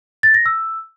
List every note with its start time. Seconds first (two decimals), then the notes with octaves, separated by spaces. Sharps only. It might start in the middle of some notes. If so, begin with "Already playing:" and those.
0.23 A6
0.34 A#6
0.46 E6